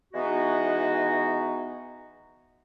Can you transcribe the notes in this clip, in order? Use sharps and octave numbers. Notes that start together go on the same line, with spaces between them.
E3 G#3 B3 D#4 F#4